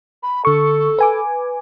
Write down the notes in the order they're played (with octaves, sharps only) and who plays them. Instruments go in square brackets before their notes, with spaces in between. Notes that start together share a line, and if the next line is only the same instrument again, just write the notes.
[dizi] B5
[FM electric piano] D3 C#6 [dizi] A4
[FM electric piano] B4 G#5 D6